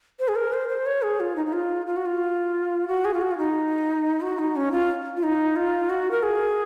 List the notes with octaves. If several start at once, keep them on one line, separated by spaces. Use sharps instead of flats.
C5
G#4
A#4
C5
C5
C#5
G#4
F4
D#4
D#4
F4
F4
F#4
F4
F#4
G#4
F4
F#4
F4
D#4
F#4
D#4
C#4
F4
F4
D#4
F4
F#4
A#4
G#4